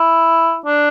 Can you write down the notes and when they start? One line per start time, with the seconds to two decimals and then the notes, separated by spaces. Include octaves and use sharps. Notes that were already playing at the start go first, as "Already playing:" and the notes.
Already playing: E4
0.66 D4